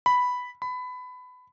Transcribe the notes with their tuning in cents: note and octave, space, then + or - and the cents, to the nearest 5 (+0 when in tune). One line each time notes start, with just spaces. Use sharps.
B5 +0
B5 +20